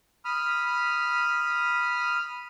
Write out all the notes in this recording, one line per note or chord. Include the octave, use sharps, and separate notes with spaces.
B5 D#6 F6